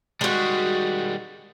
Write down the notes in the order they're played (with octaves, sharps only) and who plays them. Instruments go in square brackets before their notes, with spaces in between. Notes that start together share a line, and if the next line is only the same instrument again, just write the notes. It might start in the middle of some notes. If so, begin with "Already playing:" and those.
[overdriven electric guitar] D#3 G3 [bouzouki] G#3 F#4